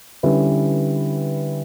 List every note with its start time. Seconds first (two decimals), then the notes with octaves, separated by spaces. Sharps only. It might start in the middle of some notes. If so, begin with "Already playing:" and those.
0.23 D3 G3 C#4 E4 B4